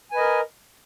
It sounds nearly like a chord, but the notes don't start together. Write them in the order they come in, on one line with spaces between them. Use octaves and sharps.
G#5 B4 D#5 A#4